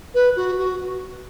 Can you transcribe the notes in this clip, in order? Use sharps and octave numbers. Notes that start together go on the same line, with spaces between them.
B4
F#4
F#4